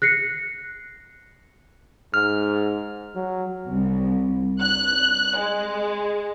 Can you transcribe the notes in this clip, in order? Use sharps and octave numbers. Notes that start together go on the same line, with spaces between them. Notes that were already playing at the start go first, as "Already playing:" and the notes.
F#6 A#6 C7 C#7
G#2 F6
F#3
C2
F#6
G#3